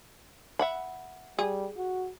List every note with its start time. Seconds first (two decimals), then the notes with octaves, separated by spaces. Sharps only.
0.59 E5 F#5 B5
1.39 G3 G#4
1.77 F#4